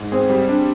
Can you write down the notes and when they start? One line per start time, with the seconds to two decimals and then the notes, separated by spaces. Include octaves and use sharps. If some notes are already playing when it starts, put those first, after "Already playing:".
Already playing: G#2
0.12 C4 G#4
0.30 G3
0.48 D4